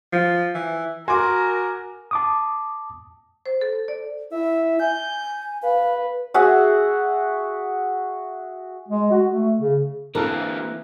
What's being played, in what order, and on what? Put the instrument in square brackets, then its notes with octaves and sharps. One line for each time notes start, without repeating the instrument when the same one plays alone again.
[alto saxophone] F3
E3
[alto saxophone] F#4 [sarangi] A#4 [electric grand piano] G#5 D6 [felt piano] C6
[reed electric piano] A5 D6 D#6
[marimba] C5
A4
D5
[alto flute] E4 [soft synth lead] E5
[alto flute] G#5 [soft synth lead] G6
[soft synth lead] B4 [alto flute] F5
[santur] F#4 G#4 E5 F#5
[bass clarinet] G#3
F#4
A3
C#3
[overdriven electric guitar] D3 A#3 [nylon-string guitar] E3 C4 [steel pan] E4 A4 A#4